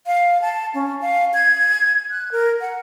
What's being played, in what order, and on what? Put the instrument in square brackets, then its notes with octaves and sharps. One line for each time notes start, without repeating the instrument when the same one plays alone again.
[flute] F5
A5
C#4
F5
G#6
F#6
A#4
F#5